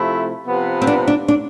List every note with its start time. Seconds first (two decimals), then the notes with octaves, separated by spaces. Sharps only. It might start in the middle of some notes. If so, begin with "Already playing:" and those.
Already playing: C3 F3 A3 E4
0.46 C3 F3 B3
0.82 C4
0.87 D4
1.08 D4
1.28 D4